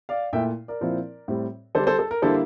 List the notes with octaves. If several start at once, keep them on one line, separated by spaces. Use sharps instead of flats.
D5 F5
A#2 A3 E4 E5 G5
A#4 D5
A#2 F3 C4 E4
A2 G3 C4
D3 G3 D4 A4 C5
A4 C5
A4
A#4
D3 G3 A#3 E4 A4 C5